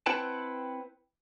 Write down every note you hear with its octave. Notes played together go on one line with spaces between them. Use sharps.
C4 E4 B4 F#5 G5 A5